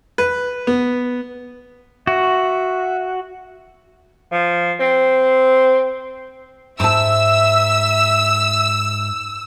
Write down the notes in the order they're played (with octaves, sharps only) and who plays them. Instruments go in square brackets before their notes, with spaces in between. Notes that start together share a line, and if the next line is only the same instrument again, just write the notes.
[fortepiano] B4
B3
[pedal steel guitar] F#4 [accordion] E5
[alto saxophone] F3
C4
[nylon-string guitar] G#2 A5 [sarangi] E5 [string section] E6